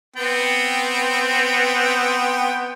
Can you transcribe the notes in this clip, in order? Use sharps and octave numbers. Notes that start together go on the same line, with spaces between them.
B3 C4 G5